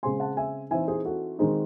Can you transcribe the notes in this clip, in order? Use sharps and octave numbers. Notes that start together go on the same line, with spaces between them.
C#3 G#3 C4 G#5 C6
F#5 A5
E5 G#5
E3 C4 D#4 E5 G#5
G#4 C5
F#4 A4
D#3 G#3 C4 D#4